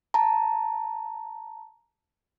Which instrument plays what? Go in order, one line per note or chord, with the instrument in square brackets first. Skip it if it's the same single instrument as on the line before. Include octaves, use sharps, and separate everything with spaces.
[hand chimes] A5 A#5